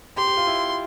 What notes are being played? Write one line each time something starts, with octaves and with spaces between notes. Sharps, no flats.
G4 C6
G4
F4
E4